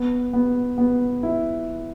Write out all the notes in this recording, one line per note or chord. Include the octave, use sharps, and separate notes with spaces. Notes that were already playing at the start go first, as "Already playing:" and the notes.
Already playing: B3
B3
B3
E4